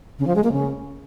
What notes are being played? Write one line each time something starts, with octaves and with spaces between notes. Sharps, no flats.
C#3
F3
G#3
A#3
C#3